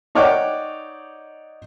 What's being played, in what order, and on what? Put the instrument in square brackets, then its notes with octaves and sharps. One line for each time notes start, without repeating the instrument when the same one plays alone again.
[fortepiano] D#4 C#5 D5 F#5 G5 D6